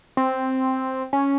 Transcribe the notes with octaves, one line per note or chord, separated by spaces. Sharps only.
C4
C#4